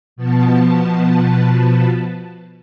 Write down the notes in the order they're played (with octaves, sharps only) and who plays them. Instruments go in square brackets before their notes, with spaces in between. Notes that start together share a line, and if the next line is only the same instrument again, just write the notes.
[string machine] B2 F3 B3 A5